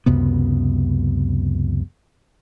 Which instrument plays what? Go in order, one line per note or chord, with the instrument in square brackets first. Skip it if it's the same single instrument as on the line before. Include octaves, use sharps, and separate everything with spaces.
[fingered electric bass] C#2 F#2 C3 B3